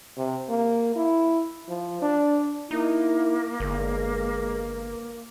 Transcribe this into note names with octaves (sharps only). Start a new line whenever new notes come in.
C3
A#3
E4
F3
D4
A#3 D#4 E4
G1 G#3